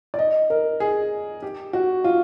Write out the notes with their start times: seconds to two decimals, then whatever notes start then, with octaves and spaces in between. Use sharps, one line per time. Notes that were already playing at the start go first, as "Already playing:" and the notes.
0.14 D5
0.19 D#5
0.50 A#4
0.80 G#4
1.42 G4
1.73 F#4
2.04 F4